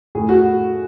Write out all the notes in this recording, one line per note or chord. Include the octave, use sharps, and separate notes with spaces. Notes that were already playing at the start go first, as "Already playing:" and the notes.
A2 G#4
F#4